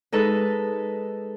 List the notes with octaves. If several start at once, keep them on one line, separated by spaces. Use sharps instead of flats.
G#3 D#4 A4 B4